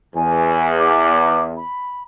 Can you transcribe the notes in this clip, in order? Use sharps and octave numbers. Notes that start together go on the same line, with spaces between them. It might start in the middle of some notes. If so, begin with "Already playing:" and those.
E2 G#5
D6
B5